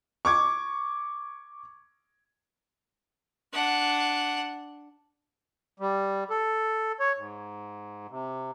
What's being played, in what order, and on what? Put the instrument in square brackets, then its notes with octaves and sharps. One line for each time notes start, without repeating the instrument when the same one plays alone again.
[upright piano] C#6 D6 G#6
[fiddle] D4 F#5
[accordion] G3
A4
C#5
G#2
C3